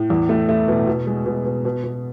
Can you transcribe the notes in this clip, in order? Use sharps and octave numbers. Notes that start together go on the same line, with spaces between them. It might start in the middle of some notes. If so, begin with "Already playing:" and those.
Already playing: A2
E2
A3
A3
B2
B2
G#3
B2
B2
B2
B2